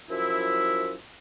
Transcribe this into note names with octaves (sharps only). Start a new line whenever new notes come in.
F#2 F3 E4